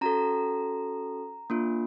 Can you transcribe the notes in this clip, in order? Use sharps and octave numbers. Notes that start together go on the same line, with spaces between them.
C#4 F#4 A4 A#5
A#3 D4 F4